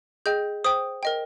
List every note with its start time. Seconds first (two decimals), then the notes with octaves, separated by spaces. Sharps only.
0.26 G#4 D#5 G5 G6
0.64 C5 G5 D#6
1.03 A#4 D#5 G5